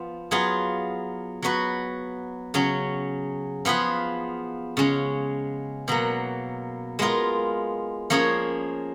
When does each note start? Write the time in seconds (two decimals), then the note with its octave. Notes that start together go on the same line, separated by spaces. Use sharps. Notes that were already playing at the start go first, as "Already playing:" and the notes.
Already playing: F3 B3 F4
0.31 F#3 B3 F4 G#4
1.42 F#3 B3 F#4 B4
2.54 C#3 F#3 C#4
3.65 F3 B3 F4 G#4 B4
4.77 C#3 G#3 C#4
5.88 B2 F#3 A#3
6.99 G#3 B3 F4 A#4
8.10 F3 A#3 C#4 G#4 C#5